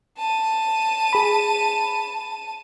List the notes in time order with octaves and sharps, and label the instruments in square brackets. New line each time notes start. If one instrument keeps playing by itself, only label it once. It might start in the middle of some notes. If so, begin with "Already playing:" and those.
[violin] A5 D#7
[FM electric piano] G#4 B5